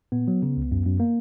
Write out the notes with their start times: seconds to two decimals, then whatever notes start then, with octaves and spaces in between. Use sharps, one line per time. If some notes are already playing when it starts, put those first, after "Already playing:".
0.12 A#2 B3
0.28 F#3
0.42 C#3
0.57 C#2
0.72 F#2
0.86 F#2
1.00 A#3